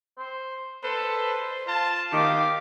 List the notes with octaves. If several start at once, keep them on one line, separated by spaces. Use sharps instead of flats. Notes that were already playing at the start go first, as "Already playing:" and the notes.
C5
A4 B4 C5
F4 A5
D#3 G4 D#5 F5 D6